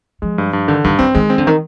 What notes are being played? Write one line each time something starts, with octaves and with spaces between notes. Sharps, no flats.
F3 G#3
G2
G2
D3 D#3
G2 D#3
D#3 C4
D#3 G#3
C4
D3
D#3